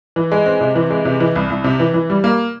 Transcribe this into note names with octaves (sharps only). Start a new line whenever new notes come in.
E3
G#3
C4
C3
E3
G#3
C3
E3
C2
C2
C3
E3
E3
G3
A#3